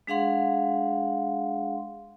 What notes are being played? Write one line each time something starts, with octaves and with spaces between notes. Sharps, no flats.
G#3 D4 G#4 F5 F#5 C6